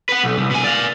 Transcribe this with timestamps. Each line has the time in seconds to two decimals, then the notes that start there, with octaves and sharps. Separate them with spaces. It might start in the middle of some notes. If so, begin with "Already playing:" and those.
0.09 B4 F#5
0.23 B1
0.38 C2
0.51 B2 G#5
0.64 D5 F5